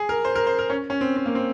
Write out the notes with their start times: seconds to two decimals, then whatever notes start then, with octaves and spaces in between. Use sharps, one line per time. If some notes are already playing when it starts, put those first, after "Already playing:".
Already playing: G#4
0.09 A#4
0.25 C5
0.35 A#4
0.47 C5
0.59 A#4
0.70 C#4
0.90 C#4
1.01 C4
1.16 C4
1.26 A#3
1.35 C4